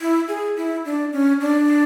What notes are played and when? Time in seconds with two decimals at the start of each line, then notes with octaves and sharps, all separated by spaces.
0.01 E4
0.28 G#4
0.57 E4
0.85 D4
1.13 C#4
1.41 D4